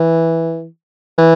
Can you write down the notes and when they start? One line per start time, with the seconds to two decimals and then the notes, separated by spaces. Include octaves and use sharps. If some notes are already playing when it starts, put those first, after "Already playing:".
Already playing: E3
1.18 E3